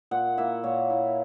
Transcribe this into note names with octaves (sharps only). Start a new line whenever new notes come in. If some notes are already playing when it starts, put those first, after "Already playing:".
A#2 F#5
A#3 E4 E5
A#2 C#5
A#3 E4